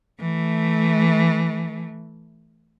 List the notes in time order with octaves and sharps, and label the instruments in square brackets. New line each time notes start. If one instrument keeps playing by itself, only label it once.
[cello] E3 A3